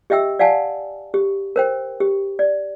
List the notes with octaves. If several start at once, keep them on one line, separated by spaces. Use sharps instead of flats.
G4 D#5 E5 G5 E6
D5 F5 F#5 G#5 A5
G4
A#4 C5 G5
G4
D5